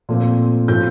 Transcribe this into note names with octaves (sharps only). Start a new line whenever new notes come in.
A#2 F3 A3 C4
A2 F3 A3 C4 G6